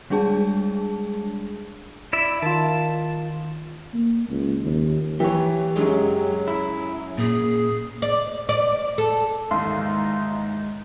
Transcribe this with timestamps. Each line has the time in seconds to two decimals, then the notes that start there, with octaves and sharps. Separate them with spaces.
0.10 G3 G#3 D4 G#4 A5
2.13 E4 D5 E5
2.42 D#3 F4 A5
3.94 A#3
4.29 C#2
4.62 D#2
5.20 E3 G4 C#5
5.76 F#2 C#3 F#3 G#3
6.48 E4
7.18 A#2 G#4
8.02 D5
8.49 D5
8.98 A4
9.51 D#2 G#2 E3 G#3 D#4 E5 F5 C6